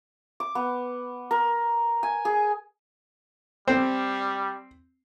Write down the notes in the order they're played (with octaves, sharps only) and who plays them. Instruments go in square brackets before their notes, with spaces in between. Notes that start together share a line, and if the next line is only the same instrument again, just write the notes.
[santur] D6
B3
A#4
G#5
G#4
[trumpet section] G3 [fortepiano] C4